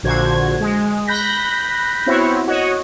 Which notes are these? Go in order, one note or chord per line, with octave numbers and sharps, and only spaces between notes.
A#1 A#2 D3 F#4 C5 G#6
G#3
B5 F#6 G6 A#6 B6
B3 C4 E4 F#4 C5 C#5
F#4 C#5 D#5